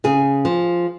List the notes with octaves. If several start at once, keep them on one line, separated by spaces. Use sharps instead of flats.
C#3 G#4
F3